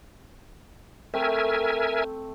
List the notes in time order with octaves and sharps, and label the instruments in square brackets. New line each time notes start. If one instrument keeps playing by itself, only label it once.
[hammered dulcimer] A3 C4 G5 [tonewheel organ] A#4 E5 G#5